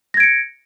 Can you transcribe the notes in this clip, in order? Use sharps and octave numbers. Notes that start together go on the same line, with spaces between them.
G#6 A#6 C#7 D7